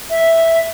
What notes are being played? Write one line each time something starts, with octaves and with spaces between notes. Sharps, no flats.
E5